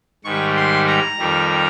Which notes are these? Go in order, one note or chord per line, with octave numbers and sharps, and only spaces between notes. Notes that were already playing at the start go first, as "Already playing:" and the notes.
G#2 D#3 G3 C#6
C6
A#5
F2 D#3 G3